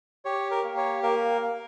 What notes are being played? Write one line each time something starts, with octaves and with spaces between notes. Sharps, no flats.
G4 C#5
A#4
A#3
C#5
A#3 A#4
A#3